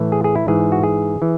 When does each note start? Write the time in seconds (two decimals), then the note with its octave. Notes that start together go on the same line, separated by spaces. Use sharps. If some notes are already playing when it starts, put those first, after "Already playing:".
Already playing: A2 E3
0.12 G#4
0.24 G#4
0.35 E4
0.48 G#2 E3 G#4
0.72 F#4
0.83 G#4
1.22 E3